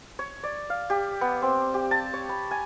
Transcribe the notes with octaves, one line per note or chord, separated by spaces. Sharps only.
C#5
D5
F5
G4
B3
C4
G4
A5
C#5
B5
G#5